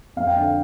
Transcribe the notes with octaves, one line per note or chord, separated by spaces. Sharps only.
F2 F5
G5
D3 F5